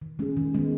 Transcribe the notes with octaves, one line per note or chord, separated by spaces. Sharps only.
D#3
G#3 C#4 G#4
D#3
G#3 B3